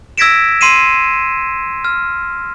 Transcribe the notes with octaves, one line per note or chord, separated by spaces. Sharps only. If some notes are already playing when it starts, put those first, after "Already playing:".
E6 G#6 A#6 B6 D7 E7
C6 C7 D#7 E7
F6